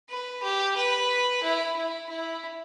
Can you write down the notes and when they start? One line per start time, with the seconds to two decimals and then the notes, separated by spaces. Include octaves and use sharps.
0.10 B4
0.43 G4
0.76 B4
1.43 E4
1.76 E4
2.09 E4